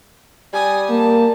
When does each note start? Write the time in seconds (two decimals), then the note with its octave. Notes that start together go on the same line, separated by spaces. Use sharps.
0.53 G3 G#5 D#6
0.90 A#3 A5